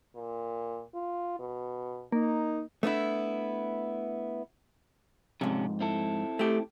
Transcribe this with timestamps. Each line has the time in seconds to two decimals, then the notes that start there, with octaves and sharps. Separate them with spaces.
0.15 A#2
0.94 F4
1.39 B2
2.12 A#3 D#4
2.83 A3 B3 D4 E4
5.41 F2 G#2 C3 C#4 D4
5.81 C4 E4 A4
6.39 A3 G4